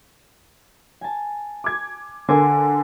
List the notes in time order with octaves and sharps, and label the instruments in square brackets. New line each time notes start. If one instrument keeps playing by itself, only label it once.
[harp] G#5 A5
[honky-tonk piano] D6 G#6
[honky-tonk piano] D3 A#4 [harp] C5 G#5 D6